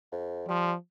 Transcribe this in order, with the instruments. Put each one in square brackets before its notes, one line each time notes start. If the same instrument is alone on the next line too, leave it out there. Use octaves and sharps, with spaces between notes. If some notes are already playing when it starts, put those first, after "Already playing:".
[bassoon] F2
[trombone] F3 [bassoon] G3